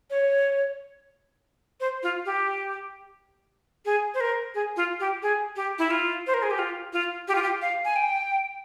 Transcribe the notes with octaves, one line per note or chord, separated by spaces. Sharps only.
C#5
C5
F4
G4
G#4
C5
A#4
G#4
F4
G4
G#4
G4
E4
F4
C5
A#4
G#4
G4
F4
F4
G4
F4
G4
F5
G#5
G5